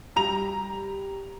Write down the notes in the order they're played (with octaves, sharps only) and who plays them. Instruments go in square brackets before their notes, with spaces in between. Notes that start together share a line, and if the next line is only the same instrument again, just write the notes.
[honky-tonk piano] G3 A#5 F7